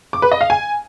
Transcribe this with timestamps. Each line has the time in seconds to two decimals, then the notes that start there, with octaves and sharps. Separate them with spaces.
0.13 D6
0.22 B4
0.32 D#5
0.41 F5
0.50 G#5